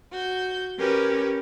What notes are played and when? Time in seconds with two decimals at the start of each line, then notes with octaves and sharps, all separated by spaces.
0.12 F#4 G6
0.79 C#4 G4 A#4 B4